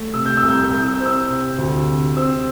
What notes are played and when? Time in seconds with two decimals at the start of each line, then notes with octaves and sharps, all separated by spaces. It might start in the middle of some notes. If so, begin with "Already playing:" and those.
Already playing: A3
0.14 C3 E6
0.26 G6
0.37 E6
0.43 C2
0.49 G6
0.59 E6
0.71 C2 G6
0.83 E6
0.94 G6
1.00 C4
1.06 E6
1.30 C3
1.58 D2
1.87 C3
2.16 C4 E6